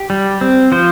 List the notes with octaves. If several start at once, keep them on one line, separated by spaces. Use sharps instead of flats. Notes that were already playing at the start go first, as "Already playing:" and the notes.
Already playing: G4
G3
C4
F3 C5